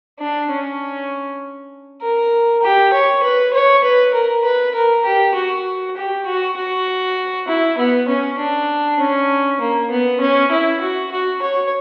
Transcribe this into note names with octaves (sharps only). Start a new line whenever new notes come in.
D4
C#4
A#4
G4
C#5
B4
C#5
B4
A#4
B4
A#4
G4
F#4
G4
F#4
F#4
E4
B3
C#4
D4
C#4
A#3
B3
C#4
E4
F#4
F#4
C#5